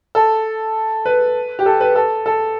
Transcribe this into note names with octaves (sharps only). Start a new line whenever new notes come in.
A4
B4
G4
A4
B4
A4
A4